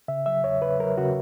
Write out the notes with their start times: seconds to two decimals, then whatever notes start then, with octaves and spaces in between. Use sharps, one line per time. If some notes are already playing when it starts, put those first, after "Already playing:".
0.08 C#3 E5
0.26 F#3 E5
0.44 E2 C#5
0.61 C#3 B4
0.79 F#3 A#4
0.98 C#3 F#4